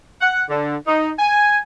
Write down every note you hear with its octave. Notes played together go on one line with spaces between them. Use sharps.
F#5
D3
D#4
G#5